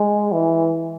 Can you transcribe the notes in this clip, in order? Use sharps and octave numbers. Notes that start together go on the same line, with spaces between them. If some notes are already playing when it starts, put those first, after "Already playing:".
Already playing: G#3
E3